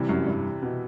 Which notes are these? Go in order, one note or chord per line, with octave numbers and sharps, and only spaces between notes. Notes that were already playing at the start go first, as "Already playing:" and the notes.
Already playing: C3 E3 G3
F#2
G2
B2